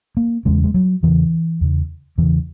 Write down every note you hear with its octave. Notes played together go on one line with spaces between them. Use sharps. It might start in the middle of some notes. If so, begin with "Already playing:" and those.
A#3
E2 C#3 G#3
G#3
F#3
E2 C#3 E3
E2 C#3
E2 C#3 E3